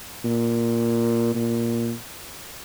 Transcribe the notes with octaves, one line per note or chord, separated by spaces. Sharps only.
A#2
A#2